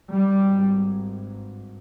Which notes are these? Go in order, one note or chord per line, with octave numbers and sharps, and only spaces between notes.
G#1 G2 G3